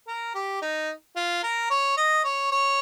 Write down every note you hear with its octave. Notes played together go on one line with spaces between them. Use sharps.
A#4
G4
D#4
F4
A#4
C#5
D#5
C#5
C#5